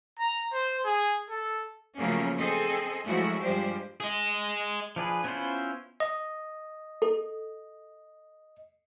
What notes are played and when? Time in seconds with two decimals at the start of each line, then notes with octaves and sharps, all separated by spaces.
0.19 A#5
0.53 C5
0.85 G#4
1.30 A4
1.96 C#3 F3 F#3 A3 A#3 C#4
2.36 C4 G#4 A4 D#5
3.04 F3 F#3 G#3 A3 E4 F#4
3.41 G2 F3 G3 G#3 G4 C5
4.00 G#4 D#5
4.96 F3 D4 G#4 B4
5.24 B3 C#4 E4 F4 C5
6.00 D#5
7.02 A4